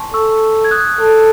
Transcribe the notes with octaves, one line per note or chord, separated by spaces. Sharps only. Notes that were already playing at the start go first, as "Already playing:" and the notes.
Already playing: G#5 A5 C6 C#6
A4 C#6 E6
G#6
D#6 F#6
A4